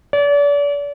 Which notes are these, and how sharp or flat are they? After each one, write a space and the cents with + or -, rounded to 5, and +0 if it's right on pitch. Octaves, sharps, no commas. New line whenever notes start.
D5 -40